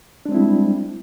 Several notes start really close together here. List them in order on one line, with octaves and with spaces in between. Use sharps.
D4 G#3 C4 E4 G3